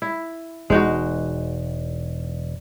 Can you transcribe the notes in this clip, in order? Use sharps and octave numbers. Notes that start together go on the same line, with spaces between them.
E4
E1 G#3 D#4 F#4